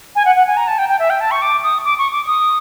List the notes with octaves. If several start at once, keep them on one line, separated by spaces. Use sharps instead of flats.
G#5
F#5
F#5
G#5
A#5
A5
G5
G5
E5
G5
A5
C#6
D6
D#6
D6
C#6
D6
D#6